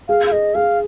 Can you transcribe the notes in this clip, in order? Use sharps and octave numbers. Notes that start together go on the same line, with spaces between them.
G#4 F5
F5
G#4 D#5
G#4 F5